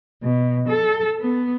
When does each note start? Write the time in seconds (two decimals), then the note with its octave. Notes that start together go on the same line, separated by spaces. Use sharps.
0.23 B2
0.67 A4
1.21 B3